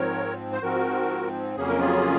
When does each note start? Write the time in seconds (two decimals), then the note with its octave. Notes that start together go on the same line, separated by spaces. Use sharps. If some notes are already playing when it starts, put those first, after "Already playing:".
Already playing: G#2 F3 C4 A#4 C#5
0.52 C5
0.62 G#2 F3 C4 F#4 A#4
1.56 F2 C#3 F#3 A#3 C#4 G#4
1.68 A#4
1.79 F4 G#4